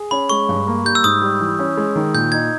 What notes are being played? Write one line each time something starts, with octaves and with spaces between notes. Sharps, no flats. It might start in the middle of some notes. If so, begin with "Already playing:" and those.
Already playing: G#4
C#4 B5
G#3 C#6
G2
A#3
G3 G6
E6
G#2 D#6
G3
E3
C#4
G#3
D#3
A#2 G6
D#4 G#6